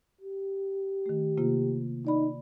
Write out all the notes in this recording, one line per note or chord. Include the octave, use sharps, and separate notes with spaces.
G4
D#3 A3
C3 A#3 F4
D#4 D5 B5